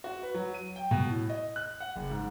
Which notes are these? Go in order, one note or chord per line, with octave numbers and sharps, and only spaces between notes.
F#4
B4
F#3
D#7
G5
B2
A2
D#5
F#6
F#5
F#1
G#2